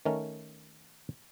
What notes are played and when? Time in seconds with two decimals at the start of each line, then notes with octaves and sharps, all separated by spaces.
0.05 D#3 A3 C#4 A#4